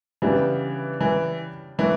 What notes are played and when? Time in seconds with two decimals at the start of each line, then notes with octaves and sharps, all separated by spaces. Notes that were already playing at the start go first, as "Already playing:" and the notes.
0.22 C#3 E3 G3 B3 D4 G4
1.01 E3
1.78 B2 E3 A3 D4